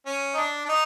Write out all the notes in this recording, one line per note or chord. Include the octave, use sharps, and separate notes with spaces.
C#4
D#4
D4
D4
D#4